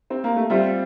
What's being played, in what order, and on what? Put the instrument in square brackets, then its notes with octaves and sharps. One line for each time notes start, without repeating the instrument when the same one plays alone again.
[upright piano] C4
A#3
A3
[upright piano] G3 [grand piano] C4 F4 C5 E5